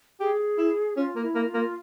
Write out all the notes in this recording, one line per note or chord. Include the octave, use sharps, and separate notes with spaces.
G4 G#4
E4
C#4 F4
A#3
E4
A#3
F4
A#3